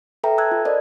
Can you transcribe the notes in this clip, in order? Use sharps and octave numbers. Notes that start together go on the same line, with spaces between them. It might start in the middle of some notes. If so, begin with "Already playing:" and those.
A4 B4 E5 G5 A#5
A5 E6 F#6 G#6
F4
A#4 C5 D5 D#5